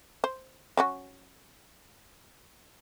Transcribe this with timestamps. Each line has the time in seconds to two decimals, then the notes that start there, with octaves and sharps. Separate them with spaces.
0.24 C5
0.77 F#3 C#4 F#4